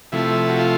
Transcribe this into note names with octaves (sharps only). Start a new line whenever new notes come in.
C3 F3 A3 E4
F#4
F4